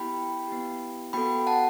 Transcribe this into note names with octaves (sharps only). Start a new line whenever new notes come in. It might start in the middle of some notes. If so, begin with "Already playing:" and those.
Already playing: B3 E4 G4 G5 B5
B3 E4 G4
B3 F#4 A4 G5 B5
F#5 A5